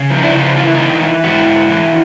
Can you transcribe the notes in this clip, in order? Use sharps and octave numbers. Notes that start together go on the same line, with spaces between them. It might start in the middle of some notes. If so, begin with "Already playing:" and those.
Already playing: C#3
F3
D#4
D4 E4
C#3 E4
D#4 F4
E3 F4
E4
E3 D#4 F4
E3
G#2 E4 F#4
G#2
E3